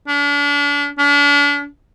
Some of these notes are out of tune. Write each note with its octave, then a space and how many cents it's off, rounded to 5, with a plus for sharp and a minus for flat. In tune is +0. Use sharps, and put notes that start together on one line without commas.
D4 -40
D4 -40